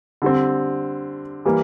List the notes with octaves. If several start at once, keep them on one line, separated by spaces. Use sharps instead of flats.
D3 G3 C4
E3 G3 A#3